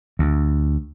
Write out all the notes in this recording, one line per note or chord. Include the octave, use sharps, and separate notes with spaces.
D2